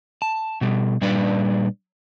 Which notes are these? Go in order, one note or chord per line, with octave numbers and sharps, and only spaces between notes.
A5
B2 G3
A#2 G3 D4 B4 D5